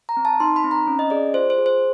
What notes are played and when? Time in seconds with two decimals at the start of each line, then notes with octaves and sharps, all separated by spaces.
0.09 A#5
0.17 C4
0.25 A5
0.40 D#4 C6
0.56 B5
0.64 C4
0.71 A#5
0.87 C#4
0.99 D#5
1.10 G#4 D5
1.34 F4 C5
1.50 C5
1.58 G#4
1.66 C5